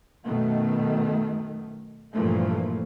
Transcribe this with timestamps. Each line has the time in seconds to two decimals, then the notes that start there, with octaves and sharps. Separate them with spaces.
0.24 F#2 B2 D#3 A3
2.13 G2 A#2 E3 F3 A3 A#3